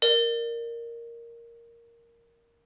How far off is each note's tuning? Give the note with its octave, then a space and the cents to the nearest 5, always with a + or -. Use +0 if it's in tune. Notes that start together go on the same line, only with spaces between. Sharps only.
A#4 +0 D5 +30